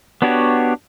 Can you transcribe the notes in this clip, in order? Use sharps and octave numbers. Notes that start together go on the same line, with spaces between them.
B3 D4 F#4 G4 C#5